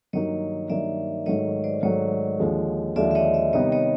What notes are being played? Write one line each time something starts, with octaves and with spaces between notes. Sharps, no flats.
G2 D#3 F#3 A#3 D#4 C#5 D#5
G2 D#3 F#3 A#3 D#4 D5 E5
G#2 D#3 F#3 A3 C#5 D#5
C5 D5
G#2 D#3 F#3 A3 C#5 D#5
D#2 D3 F3 G#3
D#2 D3 F3 G#3 D5 E5
E5
C#5 D#5
D5 E5
C3 D#3 G3 B3 D#4 C#5 D#5
C#5 D#5